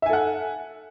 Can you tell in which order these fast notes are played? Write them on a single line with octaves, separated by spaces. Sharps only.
E5 G#5 A4 F#5